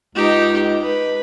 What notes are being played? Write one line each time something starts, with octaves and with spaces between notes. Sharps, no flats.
C#2 D#4 G4
B4